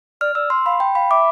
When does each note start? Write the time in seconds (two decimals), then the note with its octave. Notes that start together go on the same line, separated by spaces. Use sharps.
0.21 D5 F6
0.35 D5 E6
0.50 C6
0.66 F5 B5
0.80 G5
0.95 F5 B5
1.10 E5 D6